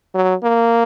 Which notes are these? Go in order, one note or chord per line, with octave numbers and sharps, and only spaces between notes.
F#3
A#3